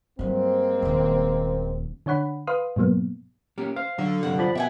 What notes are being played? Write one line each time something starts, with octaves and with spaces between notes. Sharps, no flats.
G2 F#3 G#3 A#3 C4
D#1 D#3
D3 D4 C#5 F#5 B5
B4 F5 C6 D#6
G#2 B2 F#3 A#3 B3
A#3 C#4 G4
C5 F5
D3 F#3
G2 C3 F#3 F#5
F3 D5 B5
B2 G4 E5 F#5 G#5